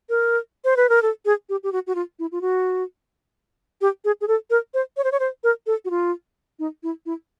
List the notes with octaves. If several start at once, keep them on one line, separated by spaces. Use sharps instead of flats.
A#4
C5
B4
A#4
A4
G#4
G4
G4
F#4
F#4
F4
E4
F4
F#4
G4
G#4
G#4
A4
A#4
C5
C#5
C5
C#5
C5
A#4
A4
F#4
F4
D#4
E4
E4